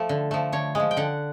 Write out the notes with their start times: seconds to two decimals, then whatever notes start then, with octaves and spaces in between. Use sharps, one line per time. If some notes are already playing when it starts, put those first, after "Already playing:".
Already playing: F3 A3
0.09 D3
0.31 F3 A3
0.52 D3 C#5
0.75 F3 G#3
0.91 G5
0.97 D3 F#5